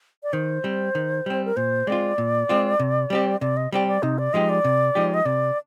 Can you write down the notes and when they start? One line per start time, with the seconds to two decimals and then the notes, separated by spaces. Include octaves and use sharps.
0.23 D5
0.33 D#3 C5
0.64 G3 C4
0.95 D#3
1.26 G3 C4
1.45 A#4
1.56 A#2 C5
1.87 G#3 C4 F4 D5
2.18 A#2
2.49 G#3 C4 F4
2.79 C3
3.10 G3 C4 G4
3.41 C3 D5
3.57 D#5
3.72 G3 C4 G4 D5
3.88 D5
4.03 C3 D#4
4.18 D5
4.33 F3 G#3 D#4 G4 D#5
4.49 D5
4.64 C3
4.95 F3 G#3 D#4 G4
5.14 D#5
5.25 C3 D5